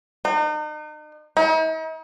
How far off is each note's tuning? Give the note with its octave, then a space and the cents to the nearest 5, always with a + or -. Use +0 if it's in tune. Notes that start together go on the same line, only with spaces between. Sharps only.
D#4 -40
D#4 +45